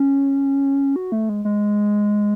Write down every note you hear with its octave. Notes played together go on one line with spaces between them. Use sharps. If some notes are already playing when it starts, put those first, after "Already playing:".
Already playing: C#4
F#4
A3
G#3
G#3